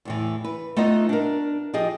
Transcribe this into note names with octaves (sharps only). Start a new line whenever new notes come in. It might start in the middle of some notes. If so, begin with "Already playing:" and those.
E2 A2 E3
B4
A3 B3 D#4 F4 D#5
D4 A#4
F3 G4 G#4 D#5